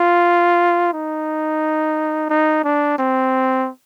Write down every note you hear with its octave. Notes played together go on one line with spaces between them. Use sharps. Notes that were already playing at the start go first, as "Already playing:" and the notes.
Already playing: F4
D#4
D#4
D4
C4